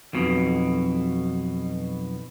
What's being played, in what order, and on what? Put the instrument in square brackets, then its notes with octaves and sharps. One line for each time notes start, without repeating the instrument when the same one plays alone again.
[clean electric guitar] B1 F2 B2